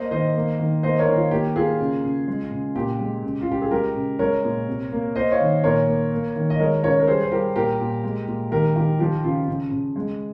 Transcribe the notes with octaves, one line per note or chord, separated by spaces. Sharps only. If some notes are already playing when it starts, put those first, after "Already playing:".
Already playing: A#3 C5 D#5
D#3 C5 D#5
A#3
D#3
A#3 C5 D#5
A#4 C#5
D#3
F4
A#3 G4
A#3 F4 G#4
C#3
C#3
G#3
C#3
A#2 G4
G#3
C#3
F4
C#3 G4
G#4
G#3 G4 A#4
C#3
G#3 A#4 C#5
A#2
C3
A#3
A#3 C5 D#5
C#5 F5
D#3
A#2 A#4 C#5
A#3
A#3
D#3
D#5
G#3 A#4 C#5
C#3 A#4 C#5
A#4
G3 G#4 C5
C5
G3 G4 A#4
A#2 G4 A#4
A#2
G#3
A#2
D#3 G4 A#4
D#3 G4
F3 G4
C#3 F4
C#3
C#3
G#3